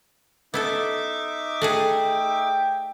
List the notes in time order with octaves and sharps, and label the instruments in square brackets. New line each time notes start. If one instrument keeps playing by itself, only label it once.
[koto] B3 E4 A4 [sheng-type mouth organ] D#4 E5 D6
[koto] A3 F#4 G#4 [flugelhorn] G5